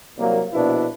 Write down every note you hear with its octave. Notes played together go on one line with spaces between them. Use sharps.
C2 F#3 A#3
A#1 B2 D4 E4 B4